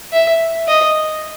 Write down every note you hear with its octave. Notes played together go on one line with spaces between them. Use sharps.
E5
D#5